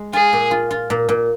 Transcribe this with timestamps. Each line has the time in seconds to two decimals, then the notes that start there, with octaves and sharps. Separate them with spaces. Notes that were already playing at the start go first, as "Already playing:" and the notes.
Already playing: G#3
0.13 F4 G#4
0.33 A#2
0.51 F4
0.71 F4
0.90 A#2
1.09 A#2